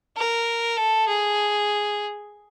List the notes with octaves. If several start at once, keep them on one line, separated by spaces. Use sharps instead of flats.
A#4
A4
G#4